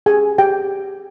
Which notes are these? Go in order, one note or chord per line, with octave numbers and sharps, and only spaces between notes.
G4 G#4 G#5
G4 G5